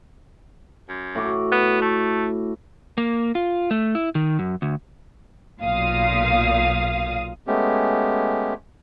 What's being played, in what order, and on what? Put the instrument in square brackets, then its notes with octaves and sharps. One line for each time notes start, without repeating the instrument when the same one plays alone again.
[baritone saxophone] F#2
[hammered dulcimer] A2 F#4 D6
[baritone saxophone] B3
A3
[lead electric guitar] A#3
F4
A3
E4
D#3
F#2
D2
[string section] B1 A#2 F5 D#6
[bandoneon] G#3 A3 B3 C#4 G4